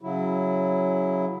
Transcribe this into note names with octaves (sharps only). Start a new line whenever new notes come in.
C#3 F#3 E4